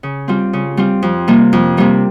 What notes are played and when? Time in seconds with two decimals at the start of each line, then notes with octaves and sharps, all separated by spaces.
0.03 C#3
0.28 G3 C4 F4
0.53 C#3
0.77 G3 C4 F4
1.02 F2
1.28 C3 G3 A#3
1.53 F2
1.77 C3 G3 A#3